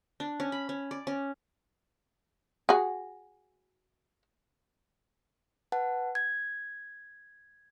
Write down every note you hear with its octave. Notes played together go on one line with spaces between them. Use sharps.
D4
C#4
B5
C#4
D5
C#4
F#4 G#4
B4 F#5 A5
G#6